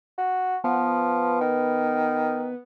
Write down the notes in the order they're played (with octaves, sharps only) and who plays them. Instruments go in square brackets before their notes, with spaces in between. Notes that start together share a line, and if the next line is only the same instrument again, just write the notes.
[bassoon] F#4
[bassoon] F3 [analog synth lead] B3
[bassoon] D#3